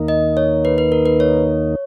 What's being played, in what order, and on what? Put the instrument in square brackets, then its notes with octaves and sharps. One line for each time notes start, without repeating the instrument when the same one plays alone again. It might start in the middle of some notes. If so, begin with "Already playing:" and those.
Already playing: [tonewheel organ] D#2 D#3 A#3 D#4
[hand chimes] D#5
C#5
B4
B4
A#4
B4
C#5